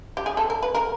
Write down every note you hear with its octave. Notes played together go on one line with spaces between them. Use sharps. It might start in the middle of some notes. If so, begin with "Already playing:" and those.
G4
G#4
A4
A#4
B4
A#4